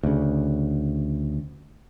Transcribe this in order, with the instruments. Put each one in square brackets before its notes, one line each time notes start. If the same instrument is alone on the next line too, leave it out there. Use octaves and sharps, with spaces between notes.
[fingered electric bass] D2 C#3